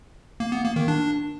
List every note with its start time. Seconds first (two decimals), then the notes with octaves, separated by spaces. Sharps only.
0.40 A#3
0.52 B3
0.64 A#3
0.76 D#3
0.88 D4